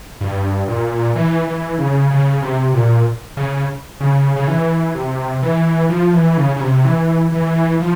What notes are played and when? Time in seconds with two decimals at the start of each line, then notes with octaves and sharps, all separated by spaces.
0.21 G2
0.68 A#2
1.16 E3
1.47 E3
1.79 C#3
2.11 C#3
2.42 C3
2.74 A#2
3.37 C#3
4.00 C#3
4.36 C#3
4.47 E3
4.95 C3
5.43 E3
5.89 F3
6.14 E3
6.37 C#3
6.56 C#3
6.61 C3
6.85 E3
7.32 E3
7.80 F3